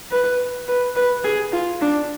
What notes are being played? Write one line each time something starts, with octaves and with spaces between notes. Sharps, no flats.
B4
B4
B4
G#4
F4
D4